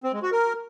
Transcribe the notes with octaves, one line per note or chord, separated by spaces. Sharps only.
C4
G#3
F#4
A#4